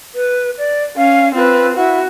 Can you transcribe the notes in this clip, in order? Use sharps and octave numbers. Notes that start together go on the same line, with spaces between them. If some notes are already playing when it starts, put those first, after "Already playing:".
B4
D5
C#4 F5
C4 F4 B4
E4 F#4